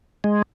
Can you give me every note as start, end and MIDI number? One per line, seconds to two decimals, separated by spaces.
0.24 0.42 56